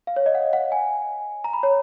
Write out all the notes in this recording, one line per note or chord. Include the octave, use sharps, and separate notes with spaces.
F5
C#5
D#5
F#5
F#5
G#5
A#5
B5
C#5